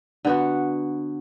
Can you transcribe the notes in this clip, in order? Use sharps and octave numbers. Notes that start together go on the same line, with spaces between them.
D3 B3 F#4